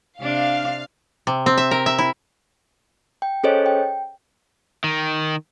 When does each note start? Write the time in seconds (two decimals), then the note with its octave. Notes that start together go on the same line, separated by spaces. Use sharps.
0.21 C3 D4 F5
1.27 C3
1.46 C4
1.58 E5
1.71 A#4
1.86 E5
1.98 E4
3.22 G5
3.44 C#4 G#4 A4 C5 C#5 D#5
3.66 G5
4.84 D#3